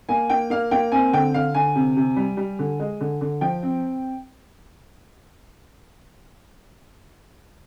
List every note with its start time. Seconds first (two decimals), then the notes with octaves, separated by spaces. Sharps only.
0.09 A#3 G#5
0.30 A#3 G5
0.50 A#3 F5
0.71 A#3 G5
0.92 C4 G#5
1.13 D3 G5
1.34 D3 F5
1.54 D3 G#5
1.75 C3
1.97 C3
2.16 G3
2.37 G3
2.59 D3
2.80 G#3
3.01 D3
3.21 D3
3.41 F3 G5
3.63 C4